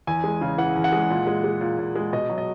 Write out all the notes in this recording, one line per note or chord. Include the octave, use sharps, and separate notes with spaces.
E2 G#5
G#3
C#3
E3 F#5
E2
F#5
G#3
A#2
G#3
G#3
A#2
A#2
G#3
B2 D#5
F#3
D#5